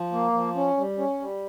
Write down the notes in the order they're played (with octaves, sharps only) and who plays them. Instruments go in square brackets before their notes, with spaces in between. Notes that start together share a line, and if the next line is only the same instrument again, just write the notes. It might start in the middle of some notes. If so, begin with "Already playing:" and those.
Already playing: [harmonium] F3
A#3
F3
C#4
G3
C#4
G3